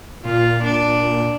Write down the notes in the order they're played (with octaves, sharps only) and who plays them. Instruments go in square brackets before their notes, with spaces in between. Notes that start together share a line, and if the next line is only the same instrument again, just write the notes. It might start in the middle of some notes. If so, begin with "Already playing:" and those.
[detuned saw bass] A#2 [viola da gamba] F4
[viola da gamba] D4